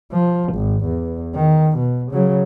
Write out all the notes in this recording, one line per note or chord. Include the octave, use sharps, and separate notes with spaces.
F3
G#1
E2
D#3
B2
C#3 F#3